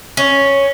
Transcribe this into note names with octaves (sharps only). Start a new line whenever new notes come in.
C#4